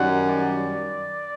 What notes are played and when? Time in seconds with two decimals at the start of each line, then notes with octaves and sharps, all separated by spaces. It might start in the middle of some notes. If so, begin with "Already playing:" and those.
Already playing: F#2 D#3 G3 F#5
0.29 D5